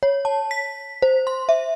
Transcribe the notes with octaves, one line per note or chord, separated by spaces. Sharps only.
C#5
A5
B6
C5
C6
E5